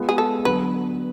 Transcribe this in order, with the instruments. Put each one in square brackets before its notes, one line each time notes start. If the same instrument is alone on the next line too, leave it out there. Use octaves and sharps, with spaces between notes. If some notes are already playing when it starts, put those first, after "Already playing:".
Already playing: [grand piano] G#3 B3 F4 B4
[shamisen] G#4
A4
[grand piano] D3 F#3 B3 [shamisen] B4